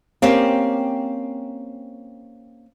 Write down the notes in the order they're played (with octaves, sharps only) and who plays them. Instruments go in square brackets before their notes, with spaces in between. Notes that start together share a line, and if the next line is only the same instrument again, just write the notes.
[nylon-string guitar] A#3 C4 C#4 G4